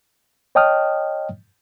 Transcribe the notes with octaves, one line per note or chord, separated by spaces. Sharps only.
C#5 D#5 G5 A5 D#6 F6